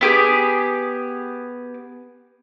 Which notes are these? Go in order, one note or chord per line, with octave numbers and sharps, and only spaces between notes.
B3 G4 G#4